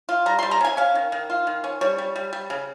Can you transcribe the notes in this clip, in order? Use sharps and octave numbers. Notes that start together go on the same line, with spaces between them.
F4
G3 A#5
G3 C6
A#5
C#4 G#5
C#4 F5
D#3
D#3
F4
D#3
C#4
G3 C#5
G3
G3
G3
C#3